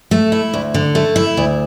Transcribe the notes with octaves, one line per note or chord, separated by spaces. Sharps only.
A3
E4
D2
D3
A3
E4
D2